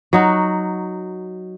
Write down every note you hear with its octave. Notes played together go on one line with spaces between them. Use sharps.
F#3 D#4 F#4